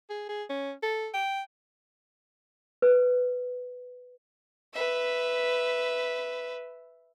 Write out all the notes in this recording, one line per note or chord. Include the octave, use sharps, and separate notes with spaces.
G#4
G#4
C#4
A4
G5
B4
B4 E5